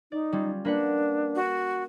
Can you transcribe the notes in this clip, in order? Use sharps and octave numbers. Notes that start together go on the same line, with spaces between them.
D#4 D5
G3 C#4 F4
A#3 D4 B4 F#5
F#4